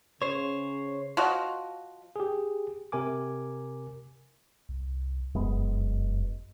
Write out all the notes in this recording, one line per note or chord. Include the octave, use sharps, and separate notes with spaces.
C#3 C5 C#5
F3 F#4 D#5
G4 G#4
C3 A#4 G#5 D6
C2
F1 F#2 G#3 B3